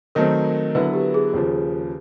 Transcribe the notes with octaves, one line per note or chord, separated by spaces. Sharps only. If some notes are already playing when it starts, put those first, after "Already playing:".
D#3 F#3 A3 C4 A#4
D3 F#3 B3 E4 B4
G4
G#4
D#2 C#3 F3